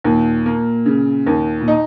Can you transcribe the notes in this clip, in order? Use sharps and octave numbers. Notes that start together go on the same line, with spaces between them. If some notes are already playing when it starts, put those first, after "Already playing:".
D#2 A#2
A#3
C#3
D#2
A#2
D#4